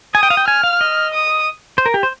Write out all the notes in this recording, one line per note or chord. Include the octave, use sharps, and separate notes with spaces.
G#5 D#6
G5
F5
G5
G#5 F6
F5
D#5
D#6
C5
A#4
G4
C5